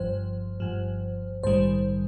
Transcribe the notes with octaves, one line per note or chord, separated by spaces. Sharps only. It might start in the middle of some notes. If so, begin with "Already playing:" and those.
Already playing: G1 G2 F3 C5
G1 G2 F3
A#1 G#2 D#3 G3 C5